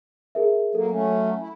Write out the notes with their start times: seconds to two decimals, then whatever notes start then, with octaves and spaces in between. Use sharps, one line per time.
0.35 G#4 A#4 E5
0.75 F#3 A#3 A4
0.91 F#3 A3 C#4
1.40 E4